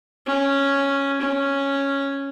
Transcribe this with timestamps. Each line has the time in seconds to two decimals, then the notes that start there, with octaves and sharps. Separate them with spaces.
0.27 C#4
1.21 C#4